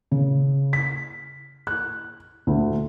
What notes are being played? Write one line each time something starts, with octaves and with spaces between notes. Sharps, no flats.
C#3
B6
F#6
D2